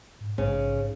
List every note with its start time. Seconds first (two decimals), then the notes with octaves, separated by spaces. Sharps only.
0.21 G#2
0.38 A#1 G#2 C#3